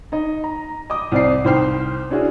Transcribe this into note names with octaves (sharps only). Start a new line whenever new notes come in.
D#4 D#5
A#5
D#5 D6 D#6
C2 C4 D5 D6 C7
C2 D#3 C5 G5 F6 C7
C#4 D4 E4 F#4 G#4